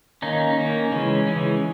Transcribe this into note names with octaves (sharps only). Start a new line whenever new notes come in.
D#3 A#3 C#4 D#4
D#3 A#3 C#4
C#3 E3 G#3 C#4
C#3 E3 G#3 C#4